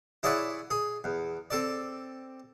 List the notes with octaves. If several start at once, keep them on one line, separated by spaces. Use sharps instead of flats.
E4 G#4 C#5 D5 E5 F#5
G#4
E2
C4 A4 D5